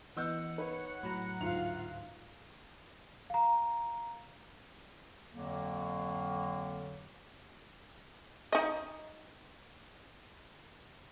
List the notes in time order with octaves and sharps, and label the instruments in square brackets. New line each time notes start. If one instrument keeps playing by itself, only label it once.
[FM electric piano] E3 B3 [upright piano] D#5 E6 G6 [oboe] F#5
[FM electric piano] D#4 [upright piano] B4 [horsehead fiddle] C#5
[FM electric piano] A2 F#3 A#5 [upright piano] B5
[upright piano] D2 G#2 F7 [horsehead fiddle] F4 F5
[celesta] F5 A#5
[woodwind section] F2 D3 F#3 A#3
[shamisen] D#4 D#5